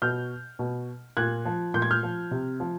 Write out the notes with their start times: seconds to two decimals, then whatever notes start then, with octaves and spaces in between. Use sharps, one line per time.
0.02 B2 F6 G6
0.59 B2
1.17 A#2 F#6 G#6
1.45 F3
1.74 A#2 G6
1.82 G#6
1.91 F6 G6
2.03 F3
2.31 C3
2.60 F3